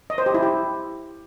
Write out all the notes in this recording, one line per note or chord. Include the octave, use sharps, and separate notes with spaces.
D#5
C5
G4
E4
G4